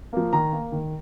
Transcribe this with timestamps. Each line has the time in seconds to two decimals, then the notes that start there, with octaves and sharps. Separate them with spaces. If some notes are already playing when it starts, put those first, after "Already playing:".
0.13 F3 A#3
0.33 D#3 A#5
0.52 A#3
0.72 D#3